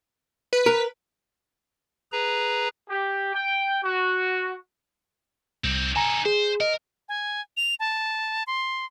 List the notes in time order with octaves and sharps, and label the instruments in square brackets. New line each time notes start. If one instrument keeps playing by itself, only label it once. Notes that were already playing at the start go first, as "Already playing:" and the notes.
[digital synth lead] B4
[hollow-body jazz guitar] A#4
[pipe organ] G#4 B4 A#5
[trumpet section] G4
G5
F#4
[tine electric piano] C2 [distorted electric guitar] C4 D#4
[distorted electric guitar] D#4 A4 [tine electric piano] G#5 A#5
[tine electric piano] G#4 [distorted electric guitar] C5
[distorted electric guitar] A#4 [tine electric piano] D#5
[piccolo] G#5
F7
A5
C6